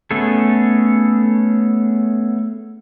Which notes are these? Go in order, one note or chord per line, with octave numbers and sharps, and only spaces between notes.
A3 B3 C#4 G#4 A4